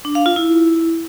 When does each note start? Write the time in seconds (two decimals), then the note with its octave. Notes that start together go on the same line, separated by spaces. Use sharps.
0.05 D4
0.15 F5
0.26 F4
0.36 E4